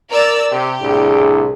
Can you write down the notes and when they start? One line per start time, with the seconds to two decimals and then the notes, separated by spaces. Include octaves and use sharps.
0.10 A#4 D5 E6
0.52 C3 G4
0.82 C2 A2 D4 G#4